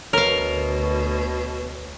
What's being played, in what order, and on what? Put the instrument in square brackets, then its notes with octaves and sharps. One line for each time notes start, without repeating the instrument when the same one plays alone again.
[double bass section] D2 [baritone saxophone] B2 [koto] A#4 F5 [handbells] C#5